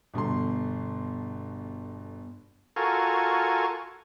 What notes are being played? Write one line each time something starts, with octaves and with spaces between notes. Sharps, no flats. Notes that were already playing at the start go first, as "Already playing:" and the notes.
G1 B2 D3 C6
F4 F#4 A4 A#4 G#5 C#6